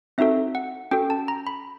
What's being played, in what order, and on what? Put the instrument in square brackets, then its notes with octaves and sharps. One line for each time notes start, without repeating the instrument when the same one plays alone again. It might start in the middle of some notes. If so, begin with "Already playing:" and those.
[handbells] C4 D#4 F#4 A4 E5
F#5
C#4 F#4 A4 G5
A5
A#5
B5